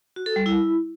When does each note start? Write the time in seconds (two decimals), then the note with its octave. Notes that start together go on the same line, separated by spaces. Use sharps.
0.16 F#4
0.26 A4
0.36 G3
0.46 E4